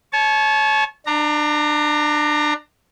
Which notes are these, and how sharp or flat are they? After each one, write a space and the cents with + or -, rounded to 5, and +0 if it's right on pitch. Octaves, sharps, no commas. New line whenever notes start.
C#5 -5 A5 -35
D4 +25 A#5 -10